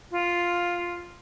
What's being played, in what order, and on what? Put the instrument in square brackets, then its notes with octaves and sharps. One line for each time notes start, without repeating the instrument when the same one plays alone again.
[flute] F4